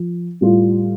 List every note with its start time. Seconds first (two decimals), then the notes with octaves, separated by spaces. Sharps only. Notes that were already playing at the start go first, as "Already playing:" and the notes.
Already playing: F3
0.41 A2 G3 F4